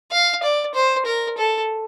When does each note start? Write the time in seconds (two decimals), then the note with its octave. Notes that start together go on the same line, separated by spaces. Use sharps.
0.12 F5
0.43 D5
0.74 C5
1.06 A#4
1.37 A4